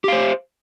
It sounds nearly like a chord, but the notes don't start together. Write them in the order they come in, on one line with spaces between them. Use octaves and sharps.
G4 F5 C5